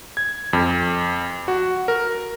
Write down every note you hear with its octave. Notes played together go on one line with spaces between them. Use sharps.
G#6
F2
F#4
A#4